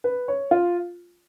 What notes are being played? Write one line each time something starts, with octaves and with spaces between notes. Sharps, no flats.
B4
C#5
F4